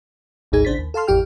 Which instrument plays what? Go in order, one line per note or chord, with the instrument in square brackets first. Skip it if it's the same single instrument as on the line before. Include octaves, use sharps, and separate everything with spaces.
[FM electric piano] G#1 D2 G#2 D#4 G#4 G#6
A1 C#3 D4 C5 A6 B6
D#2
A4 F5 A5 C6 F6
A1 F2 G4 G5 F6